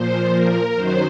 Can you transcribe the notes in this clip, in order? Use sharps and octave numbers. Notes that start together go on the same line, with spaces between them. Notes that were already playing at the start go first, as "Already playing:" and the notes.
Already playing: A#2 F3 C5
A#4
F#2 D#3 F#3 C5